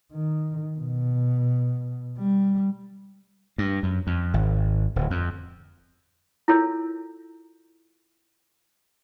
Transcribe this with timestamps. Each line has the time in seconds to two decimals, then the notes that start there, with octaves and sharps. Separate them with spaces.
0.12 D#3
0.78 B2
2.18 G3
3.58 G2
3.83 F#2
4.07 F2
4.34 G#1
4.96 D1
5.11 F2
6.48 E4 F4 A4 A#4 C#5